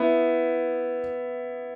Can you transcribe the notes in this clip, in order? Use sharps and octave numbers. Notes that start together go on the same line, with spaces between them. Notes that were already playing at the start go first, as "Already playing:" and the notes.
Already playing: B3 E4